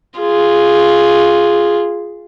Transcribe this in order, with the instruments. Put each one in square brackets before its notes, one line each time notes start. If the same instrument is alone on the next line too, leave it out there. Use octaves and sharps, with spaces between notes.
[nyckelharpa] F4 G#4